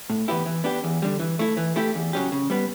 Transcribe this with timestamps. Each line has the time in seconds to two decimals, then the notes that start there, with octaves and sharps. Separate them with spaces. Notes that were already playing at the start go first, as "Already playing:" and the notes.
0.10 A2
0.28 E3 B3 E4 G4
0.46 E3
0.64 B3 D4 G4
0.84 E2
1.02 D3 G3
1.20 E3
1.39 A3 E4
1.57 E3
1.76 A3 E4 G4
1.95 E2
2.13 C#3 F#3 C#4 G4
2.32 C#3
2.50 G3 B3